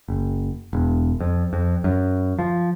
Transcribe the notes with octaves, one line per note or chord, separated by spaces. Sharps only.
F#1
E1
F2
F2
F#2
F3